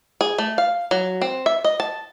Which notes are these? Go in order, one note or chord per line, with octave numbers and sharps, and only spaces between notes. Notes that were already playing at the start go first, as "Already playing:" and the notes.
G#4
A3
F5
F#3
C4
E5
D#5
A5